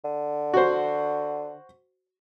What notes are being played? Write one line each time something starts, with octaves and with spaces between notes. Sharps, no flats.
D3
F#4 C5